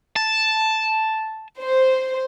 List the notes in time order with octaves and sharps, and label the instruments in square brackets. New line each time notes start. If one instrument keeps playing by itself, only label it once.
[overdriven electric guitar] A5
[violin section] C5